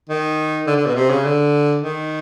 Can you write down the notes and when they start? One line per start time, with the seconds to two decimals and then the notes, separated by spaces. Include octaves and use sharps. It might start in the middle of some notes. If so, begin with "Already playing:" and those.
0.09 D#3
0.67 D3
0.77 D3
0.86 B2
0.95 C3
1.10 C#3
1.24 D3
1.82 D#3